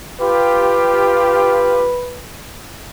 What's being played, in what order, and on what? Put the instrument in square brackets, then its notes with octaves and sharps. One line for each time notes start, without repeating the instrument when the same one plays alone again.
[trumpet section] F4 G4 [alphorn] B4